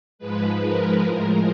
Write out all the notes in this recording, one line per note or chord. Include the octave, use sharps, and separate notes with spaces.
G#2 F3 G#3 B4
A#4
A2 F3 G#3